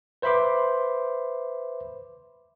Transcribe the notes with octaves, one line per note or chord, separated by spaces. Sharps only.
B4 C5 E5 B5 C6 D6